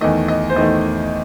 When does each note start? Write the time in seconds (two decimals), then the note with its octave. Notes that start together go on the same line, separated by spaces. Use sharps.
0.01 E2 D#3 A3 D#5
0.28 D#5
0.50 C5
0.56 E2 D#3 A3 D#5